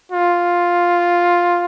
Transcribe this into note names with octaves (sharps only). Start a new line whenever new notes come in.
F4